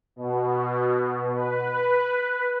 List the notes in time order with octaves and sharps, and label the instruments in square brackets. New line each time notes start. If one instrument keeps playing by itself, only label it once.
[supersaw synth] B2
B4